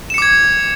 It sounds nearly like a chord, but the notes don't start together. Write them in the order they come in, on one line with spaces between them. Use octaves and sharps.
E7 C#7 D6 G#6